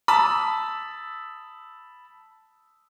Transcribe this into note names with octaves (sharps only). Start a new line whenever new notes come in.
A5 B5 D#6 E6